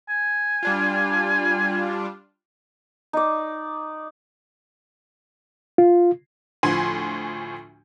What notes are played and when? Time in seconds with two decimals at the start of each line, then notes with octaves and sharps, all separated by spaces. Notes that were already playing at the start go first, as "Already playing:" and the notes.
0.09 G#5
0.63 G3 D4 F4
3.13 D#4 D5
5.78 F4
6.63 D2 A2 F3 G#5 C6 G#6